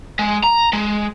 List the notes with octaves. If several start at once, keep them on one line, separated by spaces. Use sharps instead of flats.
G#3
A#5
G#3